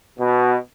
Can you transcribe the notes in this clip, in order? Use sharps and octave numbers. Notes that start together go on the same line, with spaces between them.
B2